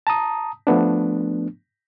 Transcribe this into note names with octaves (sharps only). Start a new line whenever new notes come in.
A5 A#5 D#6
F3 A3 B3 D4